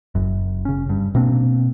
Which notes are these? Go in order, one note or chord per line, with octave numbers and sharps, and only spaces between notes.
F#1 F#2
C#3 C#4
G2
B2 A#3 C4 D4